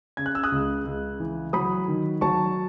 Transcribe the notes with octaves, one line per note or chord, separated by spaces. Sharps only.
C#3 G#6
F#6
E6
D#6 F#6
C#2
C#2
E3
F#3 B5 D#6
D#3
F#3 A5 C#6